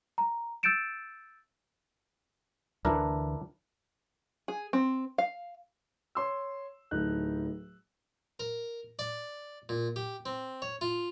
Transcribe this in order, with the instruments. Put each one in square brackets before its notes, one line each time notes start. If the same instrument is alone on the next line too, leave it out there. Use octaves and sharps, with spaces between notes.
[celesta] A#5
E6 G6 A6 C#7 D7 E7
[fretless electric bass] D2 D3 E3 [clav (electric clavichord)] D4 E4 A#4
[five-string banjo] G#4
C4
F5
[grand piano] C#5 C6 E6
D1 A2 D#4 A4 F#6
[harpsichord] A#4
D5
A#2
G4
C4
C#5
F4